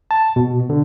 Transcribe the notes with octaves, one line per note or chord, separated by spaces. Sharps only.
A5
B2
D3